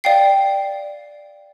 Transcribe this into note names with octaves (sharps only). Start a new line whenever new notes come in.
D5 F5 G5 C7